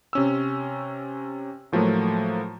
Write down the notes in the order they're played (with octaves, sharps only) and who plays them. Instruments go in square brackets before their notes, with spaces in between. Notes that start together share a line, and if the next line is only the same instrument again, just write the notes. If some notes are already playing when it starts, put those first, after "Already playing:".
[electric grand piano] C3 C#4 E6
A2 F3 F#3 A3 A#3